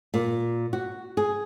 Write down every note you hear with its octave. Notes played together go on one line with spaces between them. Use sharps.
A#2
F#4
G#4